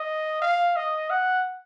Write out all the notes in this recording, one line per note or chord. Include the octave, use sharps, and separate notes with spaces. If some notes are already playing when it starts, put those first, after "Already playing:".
Already playing: D#5
F5
D#5
F#5